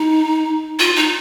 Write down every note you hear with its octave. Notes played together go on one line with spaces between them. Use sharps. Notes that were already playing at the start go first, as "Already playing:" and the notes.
Already playing: D#4
F4
D#4